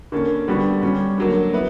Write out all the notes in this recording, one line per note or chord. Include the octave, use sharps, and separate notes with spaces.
D3 A#3 C#4
D3 G3 B3 F#4
G3 C#4 F#4
D3 F#3 A#3
B3 E4 B4